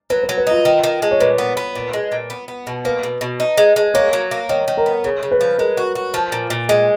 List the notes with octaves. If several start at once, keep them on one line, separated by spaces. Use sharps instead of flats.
F#3 B4
B4
F#3
B4
D#4 F4
D#3
D#3
G#3
C#5
A#2 B4
B3
B3
A#2
G#3
A#2
B3
B3
B2
A#3 B4
B2
B2
D#4
G#3
G#3
A#3 C#5
F#3
A#3
D#3 C#5
D#3
A#4
B3
C#3 C#5
C#3
B4
F3
G#3 A#4
F#4
F#4
F3
A#2
A#2
G#3 G#4